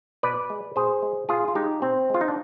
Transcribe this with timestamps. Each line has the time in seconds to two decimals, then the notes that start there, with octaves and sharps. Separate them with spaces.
0.23 B2 B4 D5
0.50 G#3
0.76 B2 G#4 C5
1.02 G#3
1.29 B2 F4 G#4
1.48 F4
1.55 G#3 D#4 G4
1.82 B2 C4
2.10 G#3 F4
2.21 D#4
2.28 D4